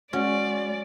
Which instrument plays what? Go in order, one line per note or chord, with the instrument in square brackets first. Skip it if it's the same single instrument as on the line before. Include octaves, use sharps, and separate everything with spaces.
[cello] G#3 [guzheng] C#4 [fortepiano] F#4 [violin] D5